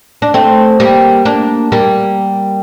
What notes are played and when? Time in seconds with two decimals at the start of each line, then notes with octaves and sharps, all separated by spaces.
0.22 D4
0.34 A3 C4
0.80 G3 A#3
1.25 A#3 D4
1.72 G3 A#3